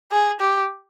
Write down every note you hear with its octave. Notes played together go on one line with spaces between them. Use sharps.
G#4
G4